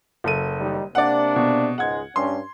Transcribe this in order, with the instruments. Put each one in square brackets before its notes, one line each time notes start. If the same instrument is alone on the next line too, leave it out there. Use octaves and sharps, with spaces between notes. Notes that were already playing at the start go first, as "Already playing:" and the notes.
[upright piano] F#1 A4 D#7
[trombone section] D#3 G3 D#4
[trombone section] C3 A#3 D4 [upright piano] D5 F#5
[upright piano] B2
[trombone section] C#2 G#2 G#3 [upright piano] F#5 G#6
[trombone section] G2 C#4 [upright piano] C6